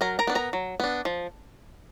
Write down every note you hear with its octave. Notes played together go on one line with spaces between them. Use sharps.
F#3 A#4 A#5
A#4 A#5
B3 D4
A#4 A#5
F#3
B3 D4
F3